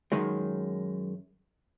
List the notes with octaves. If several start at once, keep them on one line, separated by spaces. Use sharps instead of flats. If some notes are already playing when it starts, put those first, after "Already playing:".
F#2 D#3 G#3